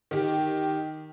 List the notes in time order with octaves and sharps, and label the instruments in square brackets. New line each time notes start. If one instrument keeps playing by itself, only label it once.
[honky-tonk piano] D#3 G4